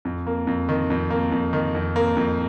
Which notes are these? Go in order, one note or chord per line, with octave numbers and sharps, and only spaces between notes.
F2
A#3
F2
D#3
F2
A#3
F2
D#3
F2
A#3
F2